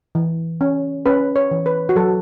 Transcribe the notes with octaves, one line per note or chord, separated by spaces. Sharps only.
E3
C#4
C#4 B4
C#5
E3
B4
F#4
F#3 A4